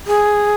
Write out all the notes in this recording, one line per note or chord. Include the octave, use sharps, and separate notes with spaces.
G#4